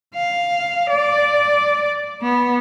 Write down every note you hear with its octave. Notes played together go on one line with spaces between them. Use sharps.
F5
D5
B3